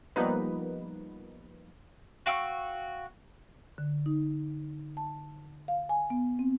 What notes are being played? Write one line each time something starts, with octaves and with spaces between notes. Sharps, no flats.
F3 G3 A#3 B3 D#4 B4
F#4 F5 G5 C#6 E6
D3
D#4
A5
F5
G#5
B3
C4